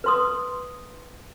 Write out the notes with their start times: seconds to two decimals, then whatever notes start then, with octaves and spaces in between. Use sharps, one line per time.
0.04 B4 C6 D#6